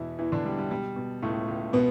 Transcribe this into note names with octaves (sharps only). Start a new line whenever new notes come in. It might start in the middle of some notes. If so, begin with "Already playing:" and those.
Already playing: E2 B2 E3 E4
E2 E3 E4
D3 D4
B2 G3
G3
B2 G3
B2
C#2 A2 A3
C#2
B2 B3